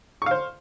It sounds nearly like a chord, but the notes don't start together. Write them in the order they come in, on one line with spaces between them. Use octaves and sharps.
C#6 F5 C5